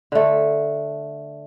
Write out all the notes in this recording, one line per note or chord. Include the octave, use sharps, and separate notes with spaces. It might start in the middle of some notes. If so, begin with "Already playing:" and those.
D3 A3